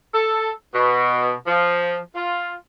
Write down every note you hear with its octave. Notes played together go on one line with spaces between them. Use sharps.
A4
B2
F3
F4